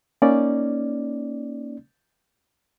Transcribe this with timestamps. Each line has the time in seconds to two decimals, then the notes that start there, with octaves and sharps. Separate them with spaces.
0.22 A#3 C#4 D#4 D5